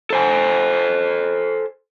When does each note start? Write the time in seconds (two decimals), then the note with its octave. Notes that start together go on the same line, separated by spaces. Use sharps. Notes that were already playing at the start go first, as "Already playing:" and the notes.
0.10 A4 C5 G#5